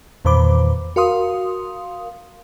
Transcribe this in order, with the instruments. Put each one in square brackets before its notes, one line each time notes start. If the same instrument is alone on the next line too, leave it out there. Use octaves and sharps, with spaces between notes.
[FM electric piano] E2 A#2 D#3 C5 B5 D6
F#4 A#4 F5 C6 D#6